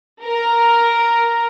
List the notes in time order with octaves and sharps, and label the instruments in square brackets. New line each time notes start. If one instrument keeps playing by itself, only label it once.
[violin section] A#4